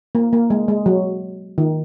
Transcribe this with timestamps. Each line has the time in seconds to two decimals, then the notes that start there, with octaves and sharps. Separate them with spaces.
0.15 A#3
0.33 A#3
0.50 G#3
0.68 G#3
0.86 F#3
1.58 D#3